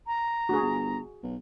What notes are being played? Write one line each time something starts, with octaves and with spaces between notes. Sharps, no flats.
A#5
D2 F#4 G#4
G1
B1